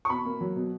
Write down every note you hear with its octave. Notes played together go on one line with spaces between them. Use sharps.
C#6
B2 B5
A#3
F#3
B2